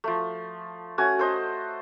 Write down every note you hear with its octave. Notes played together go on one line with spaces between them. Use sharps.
F3 A3
A3 C#4 F#4 G#5
A4 C5 D#5